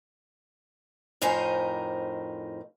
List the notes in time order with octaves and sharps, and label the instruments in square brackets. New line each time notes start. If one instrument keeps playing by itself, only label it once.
[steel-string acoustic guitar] F2 A2 D#4 A#4 C5 G#5